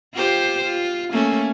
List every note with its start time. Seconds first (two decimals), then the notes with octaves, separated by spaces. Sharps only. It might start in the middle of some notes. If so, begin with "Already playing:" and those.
0.14 F4 G4 C5
0.64 F4
1.12 A3 A#3 C#4